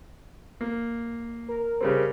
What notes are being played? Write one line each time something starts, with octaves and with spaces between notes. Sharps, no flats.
A#3
A#4
C#3 G3 C4